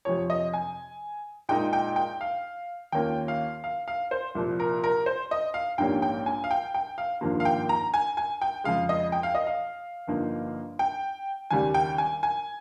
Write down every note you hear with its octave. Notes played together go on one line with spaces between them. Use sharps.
F2 C3 F3 C#5
D#5
G#5
A#2 G#3 D#4 G5
G5
G5
F5
D#2 D#3 A#3 C#4 F4 G5
F5
F5
F5
C5
C2 A#2 F3
A#4
A#4
C5
D#5
F5
A#1 G#2 G3 A#3 C#4 G5
G5
G#5
F5
G5
G5
F5
G#1 G2 F3 A#3
F5
G5
A#5
G#5
G#5
G5
F2 C#3 G#3 F5
D#5
G5
F5
D#5
F5
G1 G2 F3 A#3 D#4
G5
D#2 C#3 G3 G#5
G5
G#5
G#5